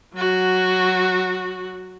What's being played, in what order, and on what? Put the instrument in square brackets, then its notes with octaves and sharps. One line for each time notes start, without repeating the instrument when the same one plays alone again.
[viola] F#3 F#4